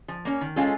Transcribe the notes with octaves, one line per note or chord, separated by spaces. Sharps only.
F3
A#3 C#4
D#3
G#3 C#4 F4 A4